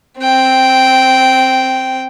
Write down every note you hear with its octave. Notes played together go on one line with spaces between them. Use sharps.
C4 G5